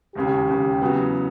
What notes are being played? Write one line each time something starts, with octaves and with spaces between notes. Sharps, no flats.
E1 D#2 C#3 G4
E1 D#2 C#3
E2 C#3 F#3 B3